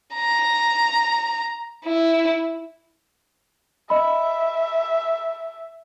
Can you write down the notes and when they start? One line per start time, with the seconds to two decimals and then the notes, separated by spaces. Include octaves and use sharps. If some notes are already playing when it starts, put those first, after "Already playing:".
0.14 A#5
1.85 E4
3.90 D#5 E5 B5